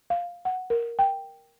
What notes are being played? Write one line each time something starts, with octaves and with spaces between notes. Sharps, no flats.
F5
F#5
A#4
G5